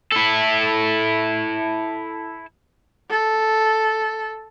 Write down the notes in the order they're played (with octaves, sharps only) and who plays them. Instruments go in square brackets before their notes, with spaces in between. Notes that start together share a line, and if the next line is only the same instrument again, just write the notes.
[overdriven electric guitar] E4 A4
[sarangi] A4